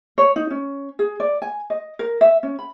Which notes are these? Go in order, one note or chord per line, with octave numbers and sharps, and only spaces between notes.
C#5
D#4
C#4
G#4
D5
G#5
D#5
A#4
E5
C#4
B5